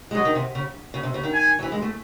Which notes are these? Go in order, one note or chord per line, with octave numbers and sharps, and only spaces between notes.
G#3
F#3 D#5
D#3
C3
C#3
C#3
C3
C#3
D#3
G#5
F#3
E3
G#3
A3